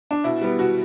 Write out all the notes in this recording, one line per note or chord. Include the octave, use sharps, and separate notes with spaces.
D4
B2 E4
G3 B3
B2 F#4